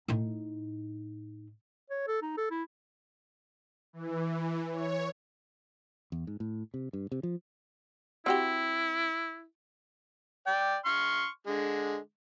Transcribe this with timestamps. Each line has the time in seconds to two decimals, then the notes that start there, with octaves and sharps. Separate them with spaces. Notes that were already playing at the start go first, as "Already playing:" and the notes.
0.08 A2 D#4
1.90 C#5
2.08 A4
2.22 D#4
2.38 A4
2.51 E4
3.93 E3
4.72 C#5
6.12 E2
6.27 G#2
6.40 A2
6.74 C3
6.93 G2
7.12 C3
7.23 F3
8.26 C4 E4 F#4 G4
10.47 D5 G5
10.85 C6 C#6 F6
11.47 D3 G#3